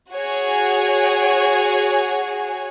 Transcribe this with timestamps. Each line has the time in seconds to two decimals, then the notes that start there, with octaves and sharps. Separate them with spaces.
0.11 F#4 G#4 C#5 G#5